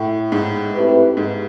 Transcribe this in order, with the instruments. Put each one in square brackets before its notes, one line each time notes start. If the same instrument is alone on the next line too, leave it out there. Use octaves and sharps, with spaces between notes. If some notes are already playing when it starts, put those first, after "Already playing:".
Already playing: [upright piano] A2
G#2
[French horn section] A3 C4 E4 G4 B4
[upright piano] G#2